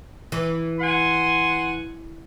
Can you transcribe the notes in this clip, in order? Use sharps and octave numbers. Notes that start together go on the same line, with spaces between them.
E3
F#5 G#5 C6